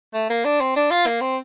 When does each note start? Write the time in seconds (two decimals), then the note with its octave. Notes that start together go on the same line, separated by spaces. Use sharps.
0.14 A3
0.30 A#3
0.45 D4
0.61 C4
0.76 D4
0.91 F4
1.07 A#3
1.21 C4